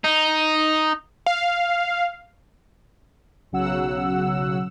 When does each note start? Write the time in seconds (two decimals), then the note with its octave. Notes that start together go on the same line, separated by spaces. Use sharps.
0.04 D#4
1.26 F5
3.52 B1 C#3 F#3 F#5 E6